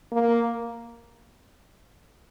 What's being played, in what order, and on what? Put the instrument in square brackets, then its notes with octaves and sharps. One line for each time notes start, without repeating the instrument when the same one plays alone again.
[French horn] A#3